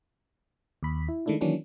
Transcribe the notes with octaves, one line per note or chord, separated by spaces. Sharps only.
D#2 B5
E4
D#3 G#3 A3 D4 E4
D#3 E3 F#3 A#3 C#4 D4